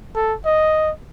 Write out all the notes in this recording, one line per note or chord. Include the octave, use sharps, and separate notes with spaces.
A4
D#5